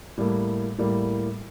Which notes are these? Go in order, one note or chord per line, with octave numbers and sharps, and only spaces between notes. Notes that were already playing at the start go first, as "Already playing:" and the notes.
A2 G3 A#3
A2 G3 A#3